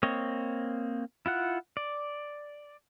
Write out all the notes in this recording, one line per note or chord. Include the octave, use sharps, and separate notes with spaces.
A#3 C4 C#5 D#5
E4 F4 F#5
D5